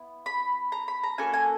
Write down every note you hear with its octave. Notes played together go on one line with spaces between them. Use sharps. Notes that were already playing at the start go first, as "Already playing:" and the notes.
Already playing: B3 E4
B5
A#5
B5
A#5
A#3 C#4 F#4 A4 G#5
G#5